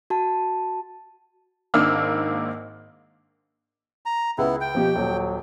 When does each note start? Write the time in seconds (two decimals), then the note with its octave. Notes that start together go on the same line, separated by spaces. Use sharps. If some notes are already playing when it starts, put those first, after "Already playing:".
0.10 F#4 A5
1.74 G#1 G#2 A#3 D4 E6 F6
4.06 A#5
4.38 C#2 B3 E4
4.61 G5
4.75 B2 F3 G4
4.96 D#1 F#3